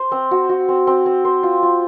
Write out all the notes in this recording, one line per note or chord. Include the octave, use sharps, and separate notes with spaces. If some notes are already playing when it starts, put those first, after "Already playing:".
Already playing: C5
C4
F#4
F#4
C4
C4
C4
C5
F4
F4